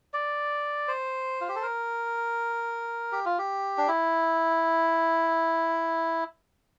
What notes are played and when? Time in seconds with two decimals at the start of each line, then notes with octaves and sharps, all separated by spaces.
0.14 D5
0.88 C5
1.41 F4
1.48 G4
1.55 A4
1.62 A#4
3.12 G4
3.26 F4
3.38 G4
3.78 D4
3.88 E4